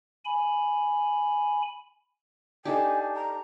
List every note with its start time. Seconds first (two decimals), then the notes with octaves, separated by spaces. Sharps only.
0.25 G#5 B5
2.65 D4 D#4 G4 A4 G#5
3.14 A#5